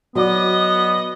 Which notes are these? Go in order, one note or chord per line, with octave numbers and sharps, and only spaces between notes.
F#3 B3 F#4 D5 D#5 D6